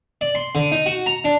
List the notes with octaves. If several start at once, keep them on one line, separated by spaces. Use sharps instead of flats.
D5
C6
D3
D#4
F#4
A#5
D4